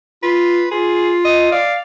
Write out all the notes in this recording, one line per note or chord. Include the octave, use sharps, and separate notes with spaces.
F4 B4
F4 G#4
D#5
D5 F5